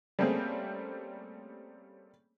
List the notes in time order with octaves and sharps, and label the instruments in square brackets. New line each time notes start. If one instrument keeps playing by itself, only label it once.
[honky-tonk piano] G3 A3 A#3 C4 C#4 G#4